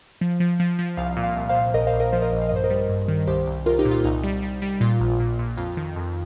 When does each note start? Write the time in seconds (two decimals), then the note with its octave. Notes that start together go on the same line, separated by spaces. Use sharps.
0.21 F3
0.40 F3
0.60 F3
0.79 F3
0.97 C2 F5
1.17 A#2
1.24 F5
1.36 C2
1.49 C5 F5
1.55 A#2
1.74 A#1 A#4 D#5
1.87 C5 F5
1.93 A#1
2.00 A#4 D#5
2.12 F3 C5 F5
2.22 A#4 D#5
2.32 A#1
2.42 F5
2.49 G2 D#5
2.56 C5
2.64 A#4 D#5
2.70 G3
2.89 G2
3.08 D#3
3.27 C2 G4 C5
3.47 C2
3.66 C2 F4 A#4
3.79 D#4 G4
3.85 A#2
3.91 F4
4.04 C2 D#4
4.23 G3
4.43 G3
4.62 G3
4.80 A#2 F4
5.00 A#1
5.20 A#2
5.39 A#2
5.57 F2 F4
5.77 D#3
5.96 F2